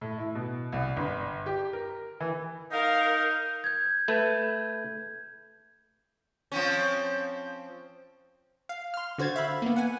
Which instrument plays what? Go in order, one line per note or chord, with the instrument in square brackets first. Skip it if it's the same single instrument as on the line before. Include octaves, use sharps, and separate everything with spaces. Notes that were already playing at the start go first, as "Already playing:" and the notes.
[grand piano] A2
E4
B2
C2
G1
G4
A#4
E3
[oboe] D#4 [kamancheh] A#4 F5
[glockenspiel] G6 G#6
[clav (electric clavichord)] A3 B4 E5
[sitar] F3 C4 C#4
[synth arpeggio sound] F5
C6 F6
D3 F#4 C5 G#6 A6
E5 F5 B5
A#3 B3
F#5 G#5